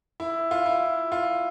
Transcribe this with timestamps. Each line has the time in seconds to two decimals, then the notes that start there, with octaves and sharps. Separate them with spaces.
0.20 E4
0.51 F4
0.66 E4
1.12 F4